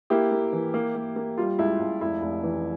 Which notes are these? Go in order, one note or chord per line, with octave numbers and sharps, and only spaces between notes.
A#3 E4 G4
A#3
E3
A#3
A#3
A#3
G3 F4
C#2 E4
C#2
F1 E4
F1
E3